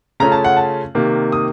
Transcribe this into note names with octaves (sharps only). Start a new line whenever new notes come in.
C#3 A3 C#4 F4 A#5
A5
F#5
A5
C3 D#3 A#3
D#6